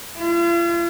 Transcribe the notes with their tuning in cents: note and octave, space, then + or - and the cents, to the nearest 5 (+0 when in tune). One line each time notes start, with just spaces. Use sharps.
F4 -45